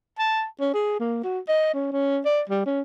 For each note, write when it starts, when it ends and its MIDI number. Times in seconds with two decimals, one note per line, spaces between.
0.19 0.44 81
0.60 0.69 61
0.74 0.97 68
1.00 1.23 58
1.24 1.39 66
1.48 1.69 75
1.74 1.88 61
1.92 2.20 61
2.25 2.41 74
2.49 2.61 55
2.66 2.82 61